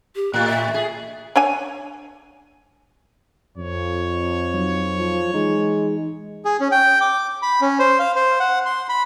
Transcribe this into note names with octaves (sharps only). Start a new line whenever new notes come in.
G4
A2 F#6
E5
G#4
D4 C#5 G#5
F2 C#5
F#3 D#4
F3
E3 G#3 D#4
G#4
C#4
G5
D6
B5
C#4
C5
F5
C5
F#5
C6
B5